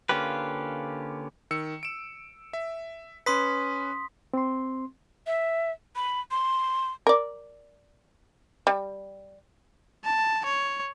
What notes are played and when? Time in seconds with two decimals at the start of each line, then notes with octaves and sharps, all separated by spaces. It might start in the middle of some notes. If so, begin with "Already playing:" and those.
0.09 D3 A#3 C#4 F4 G4 B4
1.51 D#3 E6 C#7
1.83 D7 E7
2.53 E5
3.26 C#4 B4 C6 D#6 B6
4.34 C4 C6
5.27 E5
5.96 B5
6.31 C6
7.07 A#4 D5
8.67 G3
10.04 A5
10.45 C#5